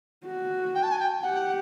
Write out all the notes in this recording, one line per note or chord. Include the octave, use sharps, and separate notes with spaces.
F#4
G5
A5
G#5
G5
G4 F#5